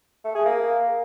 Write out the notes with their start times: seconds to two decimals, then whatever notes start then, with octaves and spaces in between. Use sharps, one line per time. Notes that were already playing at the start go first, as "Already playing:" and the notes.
0.24 A3
0.35 G#4
0.46 A#3